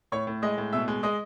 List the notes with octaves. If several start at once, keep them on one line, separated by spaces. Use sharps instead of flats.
A2 C#5 C#6
A2
G#3 D#5 D#6
A2
B2 E5 E6
G#3
G#3 D#5 D#6